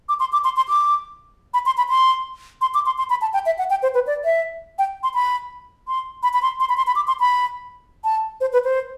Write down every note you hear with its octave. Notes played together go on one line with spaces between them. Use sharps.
D6
C6
D6
C6
C6
D6
B5
C6
B5
C6
C6
D6
C6
C6
B5
A5
G5
E5
F#5
G5
C5
B4
D5
E5
G5
C6
B5
C6
B5
B5
C6
C6
B5
C6
B5
D6
C6
B5
A5
C5
B4
C5